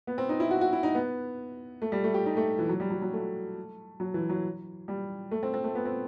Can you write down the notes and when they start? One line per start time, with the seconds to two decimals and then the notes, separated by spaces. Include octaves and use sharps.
0.07 B3
0.18 C4
0.29 D#4
0.40 E4
0.51 F#4
0.61 F#4
0.73 E4
0.83 D#4
0.95 B3
1.82 A3
1.92 G3
2.04 A3
2.14 G4
2.26 D#4
2.37 A3
2.59 E3
2.69 F#3
2.80 G3
2.90 F#3
3.02 F#3
3.13 A3
4.00 F#3
4.14 E3
4.29 F#3
4.88 G3
5.31 A3
5.43 C4
5.54 C4
5.64 A3
5.75 B3
5.85 C4